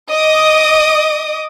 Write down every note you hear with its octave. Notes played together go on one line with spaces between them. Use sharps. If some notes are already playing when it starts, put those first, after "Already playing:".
D#5 D6 D#6